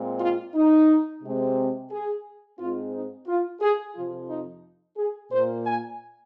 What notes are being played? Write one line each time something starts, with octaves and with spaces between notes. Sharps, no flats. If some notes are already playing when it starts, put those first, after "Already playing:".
Already playing: A#2 G#3 C4
F4
D#4
C3 G#3 C4
G#4
G#2 G#3 C4 F4
D#4
F4
G#4
F2 C3 F3 F4
D#4
G#4
A#2 A#3 C5
G#5